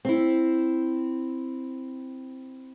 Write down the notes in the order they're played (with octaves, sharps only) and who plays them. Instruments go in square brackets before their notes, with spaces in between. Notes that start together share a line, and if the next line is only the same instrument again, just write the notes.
[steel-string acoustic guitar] C4 E4